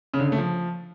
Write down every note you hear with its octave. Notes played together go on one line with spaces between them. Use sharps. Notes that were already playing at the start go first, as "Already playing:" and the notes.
C#3
D3
C#3
A3
F3